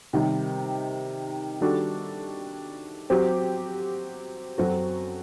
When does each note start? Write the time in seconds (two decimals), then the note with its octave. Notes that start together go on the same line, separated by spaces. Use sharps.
0.13 C3 D#3 G3
1.61 D#3 G3 D4 F#4 A4
3.10 F#3 C4 G4
4.58 F#2 F#3 C4 F#4 A4